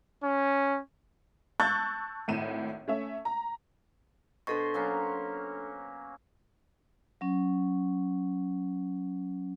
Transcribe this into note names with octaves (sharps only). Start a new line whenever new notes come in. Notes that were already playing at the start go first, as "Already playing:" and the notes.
C#4
A5 C#6 E6 F#6 G6 A6
G#1 A2 D#7 E7
A3 C#4 E5
A#5
B2 D4 A4 C5 C#6
F#3 A#3 C#4
F#3 C#4